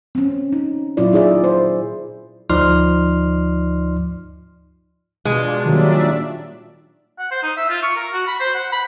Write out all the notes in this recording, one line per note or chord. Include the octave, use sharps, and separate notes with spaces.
C4 C#4
D#4
A#2 F#3 E4 F4 D5
D#4 G#4 D5 E5
C5
D2 F3 D#4 D5 C6 F6
B2 G#3 D4 F4
A#2 D#3 F#3 G3 D4 D5 E5
F#5
C5
D#4
E5
F4
C#6
A#4
F#4
B5
C5
F#5
B5